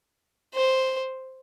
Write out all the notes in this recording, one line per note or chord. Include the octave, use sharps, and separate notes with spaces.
C5